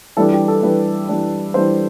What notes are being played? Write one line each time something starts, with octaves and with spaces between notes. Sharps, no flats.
E3 G3 D4 A4
G4
A4
E3 G3 D4 B4
E3 G3 D4
E3 G3 D4 C5